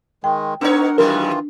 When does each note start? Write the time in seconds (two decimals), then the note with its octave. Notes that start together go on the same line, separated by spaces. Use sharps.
0.24 D#3 G#3 G5
0.61 B3 D4 D#4 A#4 C#5 F#5
0.98 G#2 D#3 E3 F#3 G#3 F4 A#4